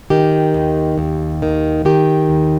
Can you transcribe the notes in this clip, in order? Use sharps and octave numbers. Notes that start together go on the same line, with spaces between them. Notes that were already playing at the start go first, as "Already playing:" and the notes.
D#3 G4
D#2
D#2
D#3
D#3 G4
D#2